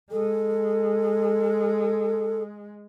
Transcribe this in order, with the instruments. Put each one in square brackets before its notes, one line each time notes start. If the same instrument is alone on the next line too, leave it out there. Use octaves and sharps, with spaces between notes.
[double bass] G#3 [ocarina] A4